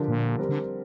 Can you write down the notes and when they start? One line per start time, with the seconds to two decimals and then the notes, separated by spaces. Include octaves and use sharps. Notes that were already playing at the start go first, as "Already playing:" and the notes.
Already playing: D3 F3 D4 G4 A#4
0.08 A#2
0.39 G3 C4 A#4
0.49 D3